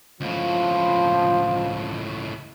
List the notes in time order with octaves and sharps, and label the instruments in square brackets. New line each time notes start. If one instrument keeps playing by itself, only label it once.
[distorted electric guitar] C#2 A2 [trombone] F3